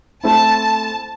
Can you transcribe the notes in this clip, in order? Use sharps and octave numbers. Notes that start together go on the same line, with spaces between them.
A3 C4 E4 A5